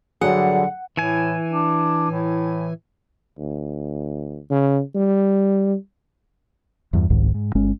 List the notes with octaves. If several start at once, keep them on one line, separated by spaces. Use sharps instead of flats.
G2 D3 F#3 G#4 F#5
A2 E3 G#5
D4
A2
D2
C#3
G3
E2 G2
F1 C2 G#2 D#3
G#2
G1 G#3 C#4